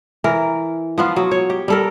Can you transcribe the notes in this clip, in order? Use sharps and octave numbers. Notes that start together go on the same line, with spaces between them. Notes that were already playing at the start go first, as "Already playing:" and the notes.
E3 A#4
F3 B3 F4
F#3
C#5
G4
G3 A4 A#4